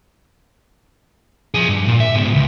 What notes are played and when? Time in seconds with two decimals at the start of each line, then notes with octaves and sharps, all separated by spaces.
1.54 F3 G#4
1.69 G2
1.88 A#2
2.00 E5
2.15 G#2 B3
2.34 C#2